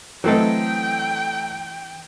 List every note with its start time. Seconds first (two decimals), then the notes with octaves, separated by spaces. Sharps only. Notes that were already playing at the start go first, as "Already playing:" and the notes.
0.24 E3 F#3 A3 C4 A4 D#5 G5